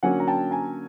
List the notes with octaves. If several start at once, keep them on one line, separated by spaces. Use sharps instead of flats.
D3 F#3 A#3 C#4 F#5 G#5
A#5
G5 A5
G#5 A#5